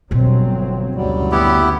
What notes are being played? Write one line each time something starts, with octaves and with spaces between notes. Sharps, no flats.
G1 B2 F#3 G#3 C4
F#1 D2 F#3 G3
B3 E4 G4